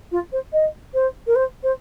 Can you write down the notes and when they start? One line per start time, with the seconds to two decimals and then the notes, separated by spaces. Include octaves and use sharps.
0.12 F4
0.32 C5
0.53 D#5
0.94 C5
1.27 A#4
1.35 C5
1.63 C5